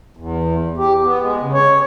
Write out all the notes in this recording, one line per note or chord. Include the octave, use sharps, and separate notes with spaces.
E2
G4
B3
G#3
C#3
C#5